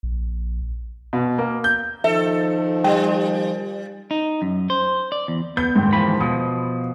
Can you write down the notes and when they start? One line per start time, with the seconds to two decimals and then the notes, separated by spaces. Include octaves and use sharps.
0.03 A#1
1.13 B2
1.38 A#3
1.64 G6
2.04 D#3 F3 A4 E5
2.84 G3 G5
4.11 D#4
4.42 F#2
4.70 C5
5.12 D5
5.28 E2
5.57 B3 G6
5.76 D#2 G#2
5.93 E3 F3 B5
6.20 B2 F3 D#6